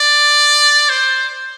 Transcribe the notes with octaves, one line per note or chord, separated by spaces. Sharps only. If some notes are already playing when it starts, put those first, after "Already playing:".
Already playing: D5
C5